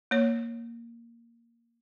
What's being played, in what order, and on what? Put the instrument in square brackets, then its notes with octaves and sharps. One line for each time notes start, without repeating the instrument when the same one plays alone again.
[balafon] A#3 C#5